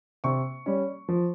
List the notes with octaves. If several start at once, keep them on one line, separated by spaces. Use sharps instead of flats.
C3 C#6
G3 C#4
F3